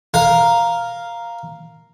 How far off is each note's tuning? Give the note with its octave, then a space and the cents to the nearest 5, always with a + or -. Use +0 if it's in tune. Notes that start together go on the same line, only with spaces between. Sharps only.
A#4 +0 F5 +0